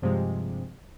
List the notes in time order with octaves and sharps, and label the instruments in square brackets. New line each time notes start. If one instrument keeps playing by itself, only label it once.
[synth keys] G2 C3 F3 G#3